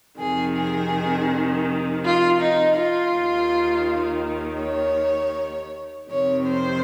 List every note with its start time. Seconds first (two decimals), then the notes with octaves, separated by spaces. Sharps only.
0.18 F2 C3 D#3 G#4
0.55 G#4
2.04 F4
2.40 D#4
2.77 F4
3.14 D#2 D#3
4.62 C#5
6.10 F2 C3 D#3 C#5
6.47 C5